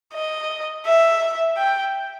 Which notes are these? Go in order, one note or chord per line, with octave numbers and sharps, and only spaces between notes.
D#5
E5
G5